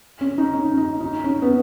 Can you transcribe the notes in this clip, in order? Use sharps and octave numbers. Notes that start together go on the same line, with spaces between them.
C#4
D#4
C#4
D#4
D#4
C#4
B3